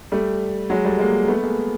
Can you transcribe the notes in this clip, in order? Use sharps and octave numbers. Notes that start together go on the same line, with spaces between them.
G3 A3
F#3 G#3
G3 A3
G#3 A#3
A3 B3
G#3 A#3